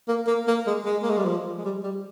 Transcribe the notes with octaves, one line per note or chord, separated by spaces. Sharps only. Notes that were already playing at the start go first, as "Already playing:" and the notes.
A#3
A#3
A#3
G#3
G#3
A#3
G#3
G3
F3
G#3
G3
G3